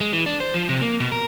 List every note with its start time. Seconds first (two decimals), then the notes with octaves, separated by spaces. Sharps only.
0.01 G#3
0.13 E3
0.26 D4
0.40 C5
0.54 F3
0.69 C3
0.81 A#3
1.00 B2
1.12 A#4